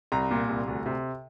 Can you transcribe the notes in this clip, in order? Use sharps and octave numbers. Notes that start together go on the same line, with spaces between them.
C2 A#5
A#2
C2
D2
C3